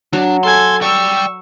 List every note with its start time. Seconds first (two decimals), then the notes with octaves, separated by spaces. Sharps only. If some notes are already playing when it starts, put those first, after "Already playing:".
0.13 F#3 D4
0.43 A4 G#5 C6
0.82 D5 G5 C#6 E6